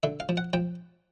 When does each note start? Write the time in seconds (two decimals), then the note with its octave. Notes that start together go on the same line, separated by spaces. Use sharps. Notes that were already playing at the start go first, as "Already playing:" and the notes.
0.03 D3 E5
0.20 F5
0.29 F3
0.37 F#5
0.53 F3 G5